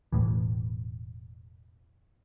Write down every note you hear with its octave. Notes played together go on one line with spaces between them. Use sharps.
E1 A#1 A2 E3